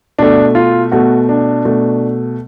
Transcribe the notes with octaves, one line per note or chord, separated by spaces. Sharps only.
B2 A3 D4
F4
B2 A3 F#4
D4
B2 A3